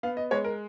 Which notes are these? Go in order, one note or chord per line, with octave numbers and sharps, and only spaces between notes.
B3 F5
D#5
G#3 C#5
A#4